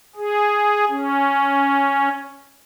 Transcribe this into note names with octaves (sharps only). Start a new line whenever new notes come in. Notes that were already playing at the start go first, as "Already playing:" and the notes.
G#4
C#4